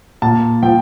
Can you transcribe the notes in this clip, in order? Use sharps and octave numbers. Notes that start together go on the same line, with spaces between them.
A#2 A5
F3 G5